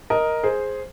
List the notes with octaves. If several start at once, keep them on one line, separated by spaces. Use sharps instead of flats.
A#4 D#5
G#4 C5